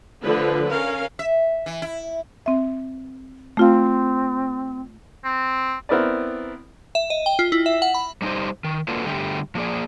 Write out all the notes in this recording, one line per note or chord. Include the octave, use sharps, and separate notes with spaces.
D3 F3 A3 B4
C#4 A#4 F5
E5
E3
E4
C4 E5
A3 C4 F4 F5
C4
B3 C4 E4 A#4 B4 D5
E5
D#5
G5
F4
E4
E5
F#5
B5
G3 D4 D#4 G4 C5
D#3
A#3 D4 F4 F#4 A4 B4
D3 G3 A3 G4
F3 A#3 G#4 D5